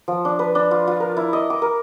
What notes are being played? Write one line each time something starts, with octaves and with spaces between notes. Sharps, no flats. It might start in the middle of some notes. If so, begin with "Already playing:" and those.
F3
D4
B4
D4
F4
F4
A#4
E4
D#5
D6
A#4